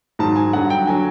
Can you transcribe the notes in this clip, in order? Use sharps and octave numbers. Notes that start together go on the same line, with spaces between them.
G#2 D#3 F#3 A5
G#5
G2 D3 F#3 F#5
G5
D3 F#3 G#5